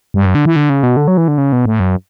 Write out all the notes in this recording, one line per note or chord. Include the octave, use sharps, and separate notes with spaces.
G2
F#2
D3
E3
D3
C#3
B2
D3
F#3
E3
D3
C#3
B2
A2
F#2